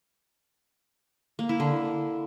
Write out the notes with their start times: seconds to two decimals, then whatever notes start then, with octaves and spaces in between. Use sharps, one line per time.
1.39 A#3
1.49 E4
1.60 D3